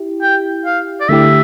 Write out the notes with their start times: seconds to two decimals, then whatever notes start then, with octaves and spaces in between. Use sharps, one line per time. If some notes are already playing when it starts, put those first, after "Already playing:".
Already playing: E4 G4
0.22 G5
0.65 F5
1.01 D5
1.09 D3 A3 E4 G4 E5